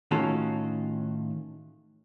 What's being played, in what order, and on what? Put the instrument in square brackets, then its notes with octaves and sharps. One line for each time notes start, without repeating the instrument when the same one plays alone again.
[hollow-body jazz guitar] A2 D#3 C#4 F4 F#4 A4